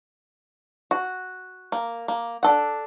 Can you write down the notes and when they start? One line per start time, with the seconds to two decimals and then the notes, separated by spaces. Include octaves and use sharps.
0.91 F#4
1.72 A#3
2.08 A#3
2.43 D4 A4 F#5